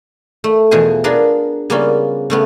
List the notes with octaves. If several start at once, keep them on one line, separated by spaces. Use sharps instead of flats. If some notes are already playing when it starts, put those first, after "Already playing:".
A3
E2 B2 E3 F3 G#4 G#5
B3 D4 F4 G#4 A#4
C#3 G3 A#3 B3 C#4 F4
C#3 A3 B3